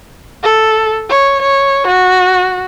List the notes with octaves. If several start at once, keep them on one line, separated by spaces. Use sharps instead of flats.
A4
C#5
C#5
F#4